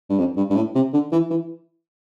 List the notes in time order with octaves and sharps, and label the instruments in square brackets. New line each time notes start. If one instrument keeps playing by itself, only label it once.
[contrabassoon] G2
F2
G2
G2
A2
C3
D3
E3
E3